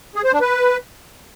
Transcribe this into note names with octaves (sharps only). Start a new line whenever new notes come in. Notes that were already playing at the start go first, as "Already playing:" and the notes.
G#4
C5
D4
B4